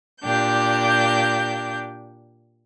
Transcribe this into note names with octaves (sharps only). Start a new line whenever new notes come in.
A#2 D4 G4 G6